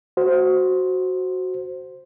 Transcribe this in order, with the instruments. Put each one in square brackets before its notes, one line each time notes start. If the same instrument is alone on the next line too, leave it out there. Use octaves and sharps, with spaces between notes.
[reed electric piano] F#4 C5